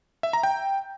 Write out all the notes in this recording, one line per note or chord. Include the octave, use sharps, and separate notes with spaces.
E5
A#5
G5